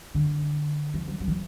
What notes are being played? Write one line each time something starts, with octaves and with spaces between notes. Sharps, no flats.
D3
E3
F#3
F#3
E3